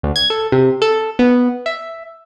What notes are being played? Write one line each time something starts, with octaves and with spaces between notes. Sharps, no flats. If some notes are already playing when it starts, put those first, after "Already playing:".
D2
G#6
A4
C3
A4
B3
E5